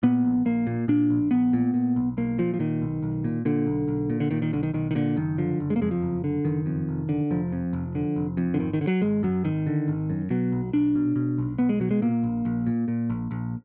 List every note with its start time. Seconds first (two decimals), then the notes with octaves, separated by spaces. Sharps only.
0.03 A#2 B3
0.25 A#1
0.45 A#1 A#3
0.67 A#2
0.88 A#2 D4
1.10 A#1
1.31 A#1 B3
1.53 A#2
1.74 A#2
1.96 B1
2.17 B1 A#3
2.38 A#2 F3
2.54 F3
2.59 A#2 D#3
2.82 B1
3.02 B1
3.24 A#2
3.45 A#2 D3
3.67 B1
3.88 B1
4.10 A#2
4.20 D3
4.31 A#2 D#3
4.42 D#3
4.53 B1 D3
4.63 D#3
4.74 B1 D#3
4.91 D#3
4.95 A#2 D3
5.16 F#1 D#3
5.38 D3 F3
5.60 F#1
5.70 G#3
5.76 A#3
5.82 F2 G#3
5.91 F3
6.02 F#1
6.24 D3
6.45 F#1 D#3
6.66 F2
6.89 F1
7.09 D3
7.31 F1 F3
7.53 F2
7.73 F1
7.95 D3
8.16 F1
8.37 F2
8.54 D3
8.59 G#1 D#3
8.73 D#3
8.81 D3
8.87 F#3
9.02 G#1 G#3
9.23 F#2 F#3
9.44 G#1 D#3
9.67 D3
9.88 G#1
10.10 F#2
10.30 B2 F#3
10.52 B1
10.73 B1 D4
10.95 B2
11.16 B2
11.38 B1
11.58 B1 B3
11.69 G#3
11.80 B2 F#3
11.91 G#3
12.02 A#2 A#3
12.23 A#1
12.45 A#1
12.67 A#2
12.88 A#2
13.10 A#1
13.31 A#1